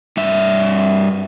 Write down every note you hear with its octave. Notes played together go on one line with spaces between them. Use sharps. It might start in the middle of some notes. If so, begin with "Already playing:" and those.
G2 E5